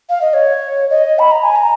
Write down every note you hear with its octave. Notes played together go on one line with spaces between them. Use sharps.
F5
D#5
C#5
D#5
B5
A#5
G#5
A#5